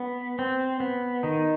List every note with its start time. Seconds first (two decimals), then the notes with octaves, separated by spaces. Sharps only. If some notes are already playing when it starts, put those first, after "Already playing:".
Already playing: B3
0.39 C4
0.80 B3
1.23 D#3 D#4